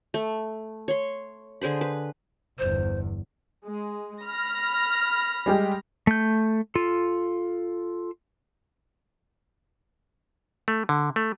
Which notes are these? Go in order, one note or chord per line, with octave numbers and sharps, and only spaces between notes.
A3
C#5 C6
D3 G#4 C5 B5
B4
G1 E2 C5
G#3
B5 F6 A#6
G3 G#3 G4
A3 G6
F4 A4
A3
D3
A3